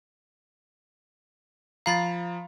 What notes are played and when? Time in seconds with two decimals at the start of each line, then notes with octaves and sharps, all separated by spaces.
1.86 F3 F5 A#5 B5 A6